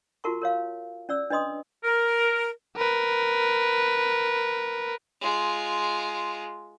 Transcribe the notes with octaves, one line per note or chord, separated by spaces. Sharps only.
F4 F#4 A#4 A5 C#6
A#4 C#5 F5
C#4 D5 E6
D4 B4 D#5 C6 D#6
A#4
A#4 B4
G#3 F4